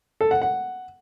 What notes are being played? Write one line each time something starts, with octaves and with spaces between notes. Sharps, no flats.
A4
F#5
F#5